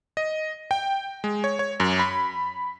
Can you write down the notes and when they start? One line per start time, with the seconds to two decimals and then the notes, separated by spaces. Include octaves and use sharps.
0.17 D#5
0.71 G5
1.24 G#3
1.44 C#5
1.59 C#5
1.80 F#2
1.99 B5